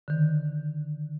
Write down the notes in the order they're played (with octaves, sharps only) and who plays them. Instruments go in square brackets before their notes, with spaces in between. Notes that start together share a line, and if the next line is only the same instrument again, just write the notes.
[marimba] D3 D#3